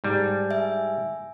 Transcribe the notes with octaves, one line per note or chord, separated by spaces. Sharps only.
G#2 G3 D4
E5 G#5